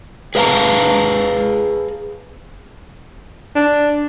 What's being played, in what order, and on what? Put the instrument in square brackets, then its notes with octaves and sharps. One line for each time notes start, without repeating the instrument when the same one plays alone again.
[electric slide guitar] G#4 B4 F5 F#5 A5 A#5
[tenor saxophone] D4